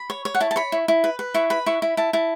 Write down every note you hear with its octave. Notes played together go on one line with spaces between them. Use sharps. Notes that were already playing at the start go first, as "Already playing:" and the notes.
Already playing: B5
C#5
C#5
F#5
E4 A5
A5
C#5 B5
E4
E4
B4
B4
E4 C#6
B4 B5
E4 C#6
E4 B5
E4 A5
E4 A5